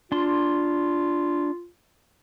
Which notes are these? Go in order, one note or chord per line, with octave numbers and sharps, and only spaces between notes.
D4 F4 C6